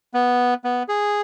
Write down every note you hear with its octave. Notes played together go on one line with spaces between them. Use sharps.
B3
B3
G#4